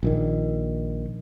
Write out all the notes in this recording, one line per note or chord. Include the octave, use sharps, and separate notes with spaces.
A#1 A#2 D#3